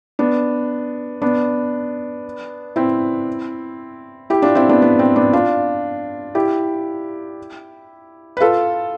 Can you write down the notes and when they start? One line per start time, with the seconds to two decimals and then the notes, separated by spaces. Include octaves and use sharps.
0.19 B3 D4
1.22 B3 D4
2.76 C4 E4
4.30 E4 G4
4.42 D4 F4
4.55 C4 E4
4.69 B3 D4
4.82 B3
4.99 C4
5.16 B3 D4
5.33 D4 F4
6.35 E4 G4
8.37 B4
8.40 F4 A4